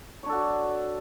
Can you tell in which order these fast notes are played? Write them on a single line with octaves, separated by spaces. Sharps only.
C#5 D4 A4 F#4